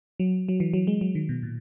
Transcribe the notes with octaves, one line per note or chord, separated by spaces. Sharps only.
F#3
F#3
E3
F#3
G#3
F#3
D#3
B2
A#2